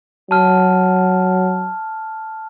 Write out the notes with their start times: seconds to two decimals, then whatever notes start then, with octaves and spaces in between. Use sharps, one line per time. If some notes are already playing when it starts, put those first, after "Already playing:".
0.31 F#3 A5 F6